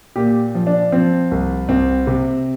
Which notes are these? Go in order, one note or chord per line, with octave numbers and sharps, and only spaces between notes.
A#2 G4
F3
D4
F3 C4
C2
C2 C4
C3